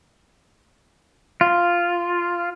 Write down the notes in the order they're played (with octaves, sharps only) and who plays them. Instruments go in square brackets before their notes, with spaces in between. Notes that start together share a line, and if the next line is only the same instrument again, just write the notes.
[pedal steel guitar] F4